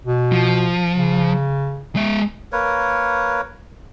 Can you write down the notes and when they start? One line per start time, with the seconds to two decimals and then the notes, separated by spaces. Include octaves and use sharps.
0.06 B2
0.32 F3
0.95 C#3
1.96 G#3 E5
2.52 A#3 A#4 B4 C#5